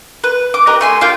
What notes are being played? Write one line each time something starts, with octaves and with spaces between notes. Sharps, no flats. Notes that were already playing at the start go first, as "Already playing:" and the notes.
B4
D6
G4 A#4 B4 D#5
A3 G#5 C6
A#3 F4 G5 G6